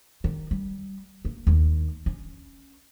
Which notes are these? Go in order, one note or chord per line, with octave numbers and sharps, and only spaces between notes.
D#3
G3
A#3
D#2
C#4